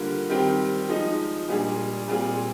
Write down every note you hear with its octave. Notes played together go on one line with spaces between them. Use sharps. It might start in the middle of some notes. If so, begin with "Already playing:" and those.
Already playing: D3 G3 A#3 F4
D#3 G3 C4 G4
F3 G#3 D#4
A#2 G3 D4 G#4
A#2 G3 C4 F4 G#4